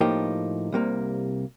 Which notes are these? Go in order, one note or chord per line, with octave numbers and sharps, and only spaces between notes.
A2 F3 A#3 D#4 G4
C2 C3 G3 A#3